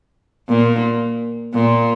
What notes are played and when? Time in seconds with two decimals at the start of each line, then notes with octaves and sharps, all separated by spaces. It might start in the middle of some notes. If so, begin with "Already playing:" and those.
0.49 A#2
1.54 A#2